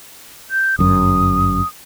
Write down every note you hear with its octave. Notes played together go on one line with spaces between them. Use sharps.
G6
G1 F#2 D#6